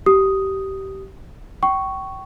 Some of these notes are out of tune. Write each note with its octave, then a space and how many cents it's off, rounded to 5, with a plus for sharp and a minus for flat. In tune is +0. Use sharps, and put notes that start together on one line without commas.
G4 -20 D#6 +0
G5 -30 C#6 +0